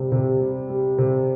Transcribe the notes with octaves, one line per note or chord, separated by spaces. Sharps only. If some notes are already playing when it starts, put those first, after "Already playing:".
Already playing: C3 G3
C3
G3
G3
C3